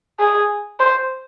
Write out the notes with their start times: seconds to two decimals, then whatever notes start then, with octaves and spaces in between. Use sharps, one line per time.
0.20 G#4
0.80 C5